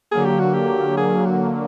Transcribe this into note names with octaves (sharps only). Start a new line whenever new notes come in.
D3 F#3 A#3 G#4
G4
F#4
G4
G#4
F#4